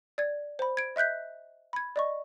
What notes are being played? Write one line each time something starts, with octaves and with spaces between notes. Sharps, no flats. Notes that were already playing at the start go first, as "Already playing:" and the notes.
D5 G#6
C5 B5
G#6 D7
D#5 E5 F#6 G6 B6
B5 G#6
D5 D#5 C#6